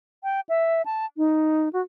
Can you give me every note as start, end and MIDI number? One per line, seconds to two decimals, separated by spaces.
0.24 0.40 79
0.49 0.82 76
0.85 1.05 81
1.17 1.69 63
1.73 1.81 66